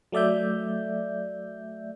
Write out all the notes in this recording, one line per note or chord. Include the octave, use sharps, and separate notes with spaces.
F#3 A3 D5 E5 G6